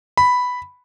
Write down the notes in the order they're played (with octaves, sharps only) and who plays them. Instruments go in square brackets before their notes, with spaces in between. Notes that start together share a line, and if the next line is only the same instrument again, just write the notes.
[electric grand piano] B5